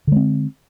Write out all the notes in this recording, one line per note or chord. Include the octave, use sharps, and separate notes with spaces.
D3 G#3 C4